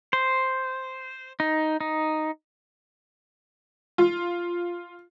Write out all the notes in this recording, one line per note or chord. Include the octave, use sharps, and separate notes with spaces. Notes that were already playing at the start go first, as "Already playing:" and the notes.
C5
D#4
D#4
F4